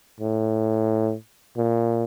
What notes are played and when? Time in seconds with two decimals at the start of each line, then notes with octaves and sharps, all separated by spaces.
0.20 A2
1.57 A#2